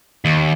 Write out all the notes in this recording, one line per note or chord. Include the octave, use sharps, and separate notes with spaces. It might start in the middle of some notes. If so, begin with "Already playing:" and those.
D#2